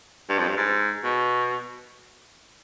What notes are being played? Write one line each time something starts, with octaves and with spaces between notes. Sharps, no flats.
G2
F2
G2
G#2
B2